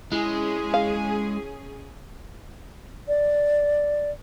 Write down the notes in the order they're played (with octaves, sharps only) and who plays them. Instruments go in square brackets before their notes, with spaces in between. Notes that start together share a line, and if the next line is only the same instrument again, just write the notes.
[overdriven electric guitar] G#3 [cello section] C#4 G#4 [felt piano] E4
[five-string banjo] F5
[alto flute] D5